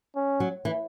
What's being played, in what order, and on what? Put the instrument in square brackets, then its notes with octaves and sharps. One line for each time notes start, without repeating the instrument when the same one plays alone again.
[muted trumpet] C#4
[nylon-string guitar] F#3
E3